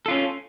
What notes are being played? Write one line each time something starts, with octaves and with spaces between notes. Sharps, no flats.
C#4 F4 A4